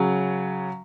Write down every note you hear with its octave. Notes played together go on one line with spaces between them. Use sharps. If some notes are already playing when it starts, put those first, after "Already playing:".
Already playing: C#3 F#3